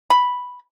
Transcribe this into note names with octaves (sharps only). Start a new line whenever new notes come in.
B5